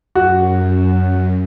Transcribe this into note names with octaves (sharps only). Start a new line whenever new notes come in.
F#2 F#4